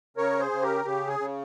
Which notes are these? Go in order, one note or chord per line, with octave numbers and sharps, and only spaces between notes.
C#3 A#4 C#5
G#4 C5
C#3
G4 A#4
C#3 G4
G#4
C#3